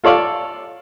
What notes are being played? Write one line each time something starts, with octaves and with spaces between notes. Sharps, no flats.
F4 A4 C#5 D5 F5